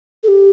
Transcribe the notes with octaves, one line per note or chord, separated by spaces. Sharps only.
A4
G4